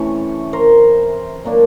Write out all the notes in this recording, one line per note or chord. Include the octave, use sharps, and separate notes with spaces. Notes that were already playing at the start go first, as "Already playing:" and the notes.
Already playing: C3 E3 A3 C#4 C#5
A#4 C5
A#2 F#3 A#3 D4